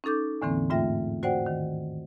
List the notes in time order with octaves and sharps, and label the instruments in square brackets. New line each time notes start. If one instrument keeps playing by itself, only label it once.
[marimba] C#4 D#4 A4 D6 G6
E2 A2 D3 E3 A#3 C4
G#2 A3 F4 E5 G5 A#6
F#4 C5 D5 F#5 G5
D#3